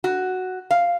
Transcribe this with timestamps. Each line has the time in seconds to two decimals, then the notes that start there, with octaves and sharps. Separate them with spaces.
0.04 F#4
0.71 F5